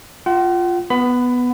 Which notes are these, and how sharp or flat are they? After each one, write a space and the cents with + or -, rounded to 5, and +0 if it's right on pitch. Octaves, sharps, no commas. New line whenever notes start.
F4 +0 F#5 +45
B3 +0 B5 +20